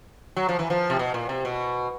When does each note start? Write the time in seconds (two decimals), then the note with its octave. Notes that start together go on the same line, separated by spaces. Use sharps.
0.36 F#3
0.49 F3
0.59 E3
0.70 F3
0.90 C3
0.99 B2
1.14 A#2
1.29 C3
1.45 B2